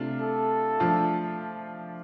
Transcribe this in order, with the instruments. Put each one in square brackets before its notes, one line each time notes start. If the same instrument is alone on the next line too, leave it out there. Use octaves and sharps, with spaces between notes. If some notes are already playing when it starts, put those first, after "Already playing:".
Already playing: [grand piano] C3 A3 D4 F4
[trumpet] A4
[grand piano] F3 A3 D4 F4